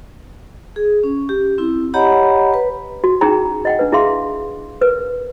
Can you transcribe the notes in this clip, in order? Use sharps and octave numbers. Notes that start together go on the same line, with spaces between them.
G#4
C#4
G4
C4 E4
G4 C#5 D#5 F#5 A#5 B5
B4
F#4
C#4 D#4 E4 G#4 G5 A#5
D#5 F#5 G5
D4 B4
E4 G#4 E5 F5 C6
A#4 B4